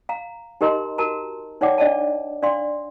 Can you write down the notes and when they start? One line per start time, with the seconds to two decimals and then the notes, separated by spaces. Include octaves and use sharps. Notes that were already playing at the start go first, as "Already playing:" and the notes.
0.09 F5 A#5
0.61 D#4 G4 A#4 D#5 A#5 C6
0.98 F#4 A#4 A5 A#5
1.61 D#4 C#5 D5 F#5 G5 D6
1.78 D4 D5 D#5 A5
2.42 D4 D5 F5 C6